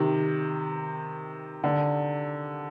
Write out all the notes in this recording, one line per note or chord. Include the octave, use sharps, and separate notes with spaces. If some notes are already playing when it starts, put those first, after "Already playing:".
Already playing: C3 D#3
D3